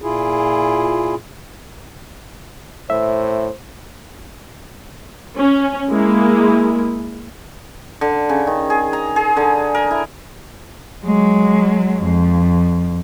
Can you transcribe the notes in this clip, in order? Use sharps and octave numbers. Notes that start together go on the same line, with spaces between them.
A#2 E4 F4 G#4
A2 C5 E5
C#4
G#3 A#3 E4
D3
C#3
D#3
G#4
A#5
G#4
D3
A#4
E4
F#3 G#3
F2